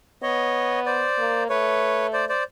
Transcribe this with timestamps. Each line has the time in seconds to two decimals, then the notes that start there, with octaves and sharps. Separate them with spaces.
0.22 B3 C#5 D#5
0.86 C5 D5
1.18 A#3
1.49 A3 B4 C#5
2.13 C5 D5
2.29 C5 D5